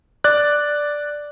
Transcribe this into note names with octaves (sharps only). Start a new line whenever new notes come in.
D5 F#6